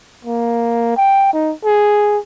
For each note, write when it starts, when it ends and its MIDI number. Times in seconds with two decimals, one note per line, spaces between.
0.25 0.94 58
0.97 1.28 79
1.33 1.53 63
1.65 2.18 68